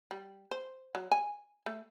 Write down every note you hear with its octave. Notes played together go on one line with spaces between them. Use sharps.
G3
C5
F#3
G#5
A3